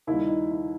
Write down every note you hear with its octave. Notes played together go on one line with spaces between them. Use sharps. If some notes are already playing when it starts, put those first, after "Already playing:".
D#2 D#3 G3 E4
D#4
E4